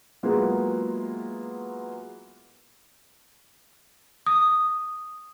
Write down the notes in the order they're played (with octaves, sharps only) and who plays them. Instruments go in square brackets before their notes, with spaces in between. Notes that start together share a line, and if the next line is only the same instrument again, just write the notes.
[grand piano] F#3 G#3 A#3 B3 E4 F4
[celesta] D#6